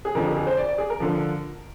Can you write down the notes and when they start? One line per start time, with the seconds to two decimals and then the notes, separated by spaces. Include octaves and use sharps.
0.05 G#4
0.15 F2 D3 F3 A#4
0.26 G#4
0.36 G#4
0.47 C5
0.57 D5
0.69 D5
0.78 G#4
0.90 A#4
1.00 D3 F3